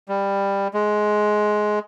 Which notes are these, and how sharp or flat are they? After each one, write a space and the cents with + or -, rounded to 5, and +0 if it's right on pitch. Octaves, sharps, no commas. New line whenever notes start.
G3 +15
G#3 +15